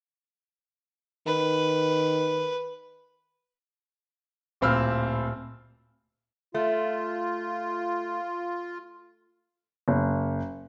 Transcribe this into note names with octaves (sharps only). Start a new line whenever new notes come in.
D#3 B4
D1 A#2 C4 B5 E6 F6
A3 F4
F#1